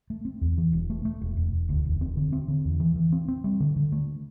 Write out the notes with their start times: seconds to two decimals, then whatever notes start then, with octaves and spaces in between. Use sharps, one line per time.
0.10 A3
0.25 C4
0.41 E2
0.58 E3
0.73 E1
0.90 A3
1.05 A3
1.21 E1
1.37 E1
1.53 E1
1.69 D2
1.85 E1
2.01 C4
2.17 D3
2.32 C4
2.48 D3
2.65 E2
2.80 E3
2.96 E3
3.12 C4
3.28 C4
3.44 G3
3.60 D3
3.76 D3
3.92 A3